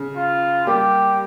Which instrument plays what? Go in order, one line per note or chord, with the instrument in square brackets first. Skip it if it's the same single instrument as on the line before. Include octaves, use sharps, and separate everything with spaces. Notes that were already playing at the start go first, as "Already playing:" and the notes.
Already playing: [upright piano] C#3
[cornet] F4
[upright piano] G3 A#3 [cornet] G4